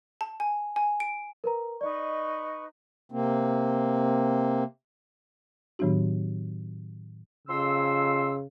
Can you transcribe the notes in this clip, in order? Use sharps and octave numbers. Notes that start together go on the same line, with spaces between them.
A5
G#5
G#5
D7
A#4 B4 A#5
D#4 B4 D5 D#5 C#6
C3 A#3 C4
A2 D#3 F#3 B3 D4 F#4
F2 C#3 C6 E6